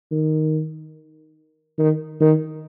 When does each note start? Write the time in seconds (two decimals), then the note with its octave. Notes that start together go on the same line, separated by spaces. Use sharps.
0.11 D#3
1.79 D#3
2.20 D#3